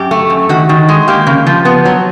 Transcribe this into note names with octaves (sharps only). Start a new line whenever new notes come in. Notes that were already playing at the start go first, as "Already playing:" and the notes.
Already playing: F#2 G4
A3
F#2
D#3 F#4
D#3
G#3
A#3 G4
C#3
F3
B3
F#3